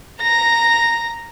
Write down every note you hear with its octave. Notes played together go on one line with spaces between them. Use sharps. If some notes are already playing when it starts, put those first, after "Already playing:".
A#5 A#6